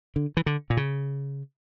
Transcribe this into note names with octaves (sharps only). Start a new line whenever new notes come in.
D3
E3
D3
A#2
C#3